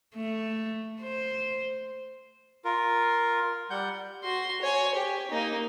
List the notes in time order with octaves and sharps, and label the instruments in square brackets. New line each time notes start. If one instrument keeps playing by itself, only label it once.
[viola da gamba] A3
C5
[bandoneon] F4 A#4
G3 F#5 G6
[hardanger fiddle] F#4 C6
C#5 G#5
G4
A#3 D#4